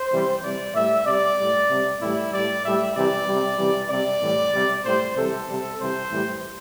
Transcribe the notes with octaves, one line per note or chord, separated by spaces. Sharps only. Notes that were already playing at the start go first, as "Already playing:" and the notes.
Already playing: C5
C3 E3 G3
C3 E3 G3 D5
A2 G3 E5
C3 G3 D5
A2 G3
C3 G3
A2 E3 G3 E4
A2 G3 D5
A2 G3 E5
C3 E3 G3 D5
C3 G3
C3 E3 G3
C3 G3 D5
A2 E3 G3
C3 G3
A2 G3 C5
C3 E3 G3 A4
C3 G3
C3 E3 G3 C5
A2 E3 G3